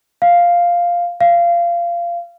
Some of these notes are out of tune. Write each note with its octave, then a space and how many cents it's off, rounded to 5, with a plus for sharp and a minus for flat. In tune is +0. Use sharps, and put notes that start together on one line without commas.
F5 +0
F5 -20